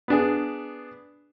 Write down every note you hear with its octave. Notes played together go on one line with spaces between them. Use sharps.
B3 D4 G#4